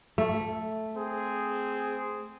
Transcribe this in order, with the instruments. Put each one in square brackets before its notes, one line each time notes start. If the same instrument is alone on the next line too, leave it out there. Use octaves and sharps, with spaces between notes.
[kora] A3
[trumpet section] C4 G#4